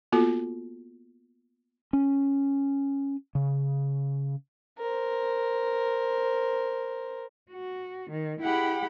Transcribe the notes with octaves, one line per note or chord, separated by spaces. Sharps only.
A#3 B3 F4 F#4 A4
C#4
C#3
A#4 C5
F#4
D#3
E4 G4 G#4 F#5 G5 B5